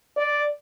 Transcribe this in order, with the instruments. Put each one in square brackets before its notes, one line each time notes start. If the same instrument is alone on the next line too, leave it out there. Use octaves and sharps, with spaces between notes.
[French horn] D5